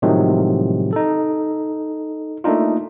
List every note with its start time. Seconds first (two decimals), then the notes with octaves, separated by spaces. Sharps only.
0.02 A2 C3 D#3 F3 F#3 G#3
0.93 D#4 A4
2.44 A3 A#3 D4 D#4 F4